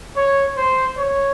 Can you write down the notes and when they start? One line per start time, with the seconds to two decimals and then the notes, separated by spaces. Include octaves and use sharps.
0.16 C#5
0.57 C5
0.98 C#5